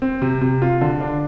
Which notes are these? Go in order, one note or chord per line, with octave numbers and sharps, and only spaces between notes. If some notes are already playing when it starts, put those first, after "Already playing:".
C4
C3
C3
F4
D3
D4